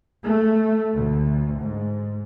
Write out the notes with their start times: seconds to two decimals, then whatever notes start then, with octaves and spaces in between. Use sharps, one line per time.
0.24 A3
0.94 D2
1.61 G#2